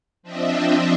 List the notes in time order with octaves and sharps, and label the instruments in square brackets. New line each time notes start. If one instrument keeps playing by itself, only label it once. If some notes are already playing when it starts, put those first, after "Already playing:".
[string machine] F3 C4 D4 D#5 E5